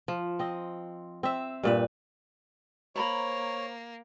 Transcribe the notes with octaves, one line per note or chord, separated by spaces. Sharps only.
F3
C4 D#5
C4 E5
G2 A#2 B4
A#3 C5 C#5 A#5 B5